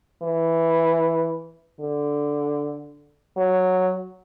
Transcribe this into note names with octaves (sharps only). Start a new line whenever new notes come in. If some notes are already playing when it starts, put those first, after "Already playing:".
E3
D3
F#3